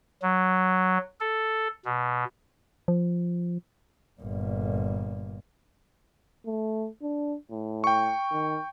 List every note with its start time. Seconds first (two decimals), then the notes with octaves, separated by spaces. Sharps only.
0.22 F#3
1.21 A4
1.85 B2
2.88 F3
4.21 G1 A#2
6.46 A3
7.02 D4
7.51 A2
7.84 G5 C#6
8.32 D#3